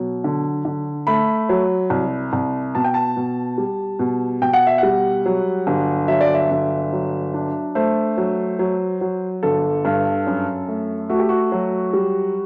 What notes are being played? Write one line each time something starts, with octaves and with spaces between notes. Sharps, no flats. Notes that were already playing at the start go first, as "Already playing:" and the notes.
Already playing: B2 F#3
D3
D3
A3 B5
F#3
C2
C2
B2 A5
G5
A5
B2
G3
B2
B2 G5
F#5
E5
G3 F#5
F#3
G1
F#3 E5
D5
E5
G1
F#3
D4
A3 C5
F#3
F#3
F#3
G1 A4
G2
F#2
A3
A3 F#4
G4
F#4
F#3
G3